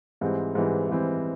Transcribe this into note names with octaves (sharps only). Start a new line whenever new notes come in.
G#2 E3 G3 C4
G#2 E3 G3 C4
G#2 E3 G3 C4